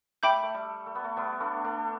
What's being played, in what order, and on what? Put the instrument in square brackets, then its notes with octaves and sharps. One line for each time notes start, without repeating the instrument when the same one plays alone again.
[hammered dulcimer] A3 [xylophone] E5 G5 B5 D6 G6
[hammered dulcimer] A3
G3
A3
B3
A3
G3 B3
A3 D4
A3 D4